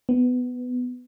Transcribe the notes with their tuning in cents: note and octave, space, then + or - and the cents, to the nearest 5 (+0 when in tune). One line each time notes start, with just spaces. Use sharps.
B3 +15